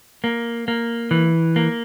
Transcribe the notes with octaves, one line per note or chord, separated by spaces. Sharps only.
A#3
A#3
E3
A#3